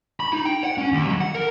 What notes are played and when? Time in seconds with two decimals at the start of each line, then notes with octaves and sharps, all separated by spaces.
0.20 B5
0.33 D#4
0.45 G5
0.64 F#5
0.78 C#4
0.92 D#2
1.07 F#3
1.20 F#5
1.35 A#4